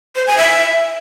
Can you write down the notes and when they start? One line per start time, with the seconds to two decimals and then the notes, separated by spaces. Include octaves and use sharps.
0.16 C5
0.27 G#5
0.38 E5